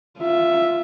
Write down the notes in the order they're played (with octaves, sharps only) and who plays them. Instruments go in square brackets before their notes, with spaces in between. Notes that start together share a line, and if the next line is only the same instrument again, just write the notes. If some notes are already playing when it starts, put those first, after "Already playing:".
[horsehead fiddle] F4 E5